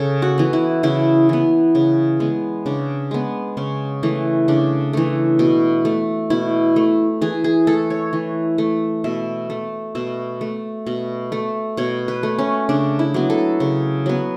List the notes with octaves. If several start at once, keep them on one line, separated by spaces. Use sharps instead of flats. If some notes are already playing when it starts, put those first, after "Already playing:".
Already playing: C#3 A4
F#4
E3 B3
E4
C#3 E4
E3 B3
C#3
G#3 B3
C#3 D4
G#3 B3
C#3 C#4
E3 A3
C#3 D4
E3 A3
B2
A3
B2 E4
A3
E3 G#4
G#4
A3 A4
C#5
E3
A3
B2 E5
A3
B2 E5
A3
B2
A3
B2 C#5
B4
A3
C#4
C#3 D4
E4
F#3 B3
A4
C#3
F#3 B3